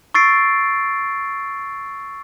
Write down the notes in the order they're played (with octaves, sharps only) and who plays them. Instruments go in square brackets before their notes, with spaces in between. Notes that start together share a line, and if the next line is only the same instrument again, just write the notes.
[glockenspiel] C#6 E6 A6 C7 D7